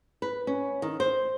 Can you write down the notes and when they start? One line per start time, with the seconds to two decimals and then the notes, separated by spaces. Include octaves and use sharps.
0.22 B4
0.47 C#4
0.82 D#3
1.00 C5